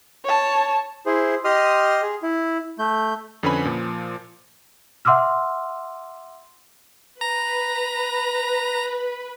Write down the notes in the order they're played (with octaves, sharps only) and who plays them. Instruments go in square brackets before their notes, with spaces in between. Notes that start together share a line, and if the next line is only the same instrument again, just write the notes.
[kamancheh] C#5 A5
[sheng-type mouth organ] E4 G#4 C5
G4 D#5 C6 D#6 F6
G#4
E4
A3 G6
[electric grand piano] F2 D3 C#4 B4 G#5 B5
A#2 F3
[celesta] E5 F#5 C6 D6 E6 F6
[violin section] B4 [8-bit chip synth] A#5